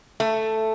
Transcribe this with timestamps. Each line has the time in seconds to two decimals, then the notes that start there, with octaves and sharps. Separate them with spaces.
0.20 A3